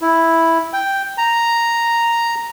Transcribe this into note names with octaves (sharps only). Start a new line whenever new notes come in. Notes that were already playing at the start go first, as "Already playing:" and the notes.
E4
G5
A#5